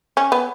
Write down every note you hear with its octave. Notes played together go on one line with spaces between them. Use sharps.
C#4
B3